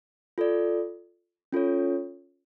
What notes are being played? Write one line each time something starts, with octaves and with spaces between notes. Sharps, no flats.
F4 A4 D5
C#4 F4 A4 C#5